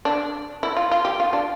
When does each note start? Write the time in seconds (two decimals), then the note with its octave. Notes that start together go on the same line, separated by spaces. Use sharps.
0.05 D4
0.63 E4
0.77 F4
0.91 F4
1.05 G4
1.20 F4
1.33 D4